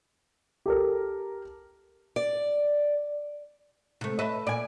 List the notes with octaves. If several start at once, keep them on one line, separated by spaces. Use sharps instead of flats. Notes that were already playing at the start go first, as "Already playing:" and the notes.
G4 A4 A#4
D5
C3 A3
A3 B4 D#5 E5
A#2 D5 G#5